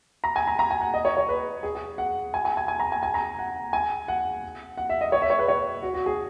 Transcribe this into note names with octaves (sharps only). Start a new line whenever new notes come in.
A#5
G#5
A#5
A#5
G#5
F#5
D#5
C#5
C#5
B4
G#4
G#4
F#5
G#5
G#5
G#5
G#5
A#5
G#5
G#5
A#5
F#5
G#5
F#5
F#5
E5
D#5
C#5
E5
C#5
B4
C#5
F#4
F#4
G#4